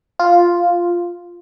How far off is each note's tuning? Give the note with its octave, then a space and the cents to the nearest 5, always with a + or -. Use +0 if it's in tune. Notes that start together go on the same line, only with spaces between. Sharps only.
F4 +0